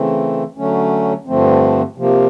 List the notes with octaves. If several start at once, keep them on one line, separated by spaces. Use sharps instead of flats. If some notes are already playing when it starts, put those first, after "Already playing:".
Already playing: C#3 E3 A3 C4
D3 F#3 A3 C#4
G2 D3 F3 A3 C4
C3 F3 A#3